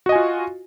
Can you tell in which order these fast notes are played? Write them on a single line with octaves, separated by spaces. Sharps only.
F#4 D#5 G#5 F4